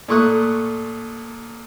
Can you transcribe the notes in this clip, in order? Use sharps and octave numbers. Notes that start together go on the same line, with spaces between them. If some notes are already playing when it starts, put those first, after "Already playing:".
A#2 A3 C#6 D#6 F#6